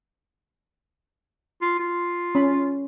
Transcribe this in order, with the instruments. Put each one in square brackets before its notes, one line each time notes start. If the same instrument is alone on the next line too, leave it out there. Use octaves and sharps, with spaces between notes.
[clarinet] F4
F4
[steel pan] C#4 B5